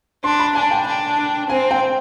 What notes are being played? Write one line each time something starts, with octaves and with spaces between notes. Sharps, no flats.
D4 C6
B5
D4 G#5
G5
D4
C4 G#5
G5